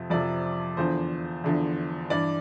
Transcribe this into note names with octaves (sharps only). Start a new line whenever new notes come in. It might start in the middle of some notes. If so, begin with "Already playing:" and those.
Already playing: F2 C3 F3
F2 C3 F3 D5
E2 D3 F3 C5
E2 D3 F3
G2 E3 D5